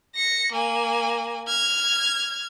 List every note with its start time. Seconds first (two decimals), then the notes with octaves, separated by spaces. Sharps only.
0.15 A#6 C#7
0.52 A#3 G#5
1.48 F6 G#6